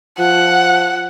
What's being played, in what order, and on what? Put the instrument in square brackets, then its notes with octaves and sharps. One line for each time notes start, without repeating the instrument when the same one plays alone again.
[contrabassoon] F3 [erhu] F#5